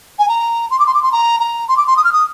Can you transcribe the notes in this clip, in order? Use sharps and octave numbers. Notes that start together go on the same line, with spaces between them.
G#5
A#5
C6
D6
C6
D6
C6
A#5
A#5
C6
D6
C6
D#6
F6
D#6